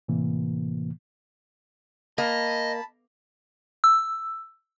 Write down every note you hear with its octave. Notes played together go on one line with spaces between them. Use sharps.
A2 C3 E3 A#3
A#3 D#5 A5 B5
E6